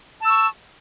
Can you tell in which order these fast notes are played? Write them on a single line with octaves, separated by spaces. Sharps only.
A5 E6 C#6